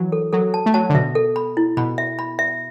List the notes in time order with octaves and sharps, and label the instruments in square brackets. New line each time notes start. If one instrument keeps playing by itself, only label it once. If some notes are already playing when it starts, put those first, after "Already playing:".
Already playing: [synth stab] E3 F#3
[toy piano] A4
[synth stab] F#3 [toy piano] A4
[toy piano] A5
[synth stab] A3
[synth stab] F#3 [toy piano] A5
[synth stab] D3
[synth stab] B2 [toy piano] E5
[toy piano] A4
B5
E4
[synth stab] B2 [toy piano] B5
[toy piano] E5
B5
E5